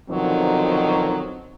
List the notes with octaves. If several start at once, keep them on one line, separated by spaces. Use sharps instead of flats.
B2 D3 D#3 F3 F#3 C4